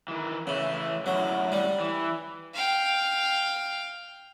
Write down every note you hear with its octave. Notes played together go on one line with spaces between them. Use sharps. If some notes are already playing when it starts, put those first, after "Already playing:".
D#3 E3
C#3 E3 A3 E5
F#2 A2 D3 F#3
G3
E3
F5 G5